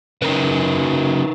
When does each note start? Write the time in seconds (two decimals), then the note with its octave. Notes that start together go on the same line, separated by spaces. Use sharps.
0.22 C#3 F#3 D#4 A#4 B4